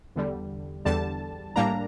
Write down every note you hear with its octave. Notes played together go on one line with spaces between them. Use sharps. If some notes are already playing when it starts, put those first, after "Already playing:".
E2 D3 G3
E2 D3 G3 A5
A2 G3 A#3 D4 A#5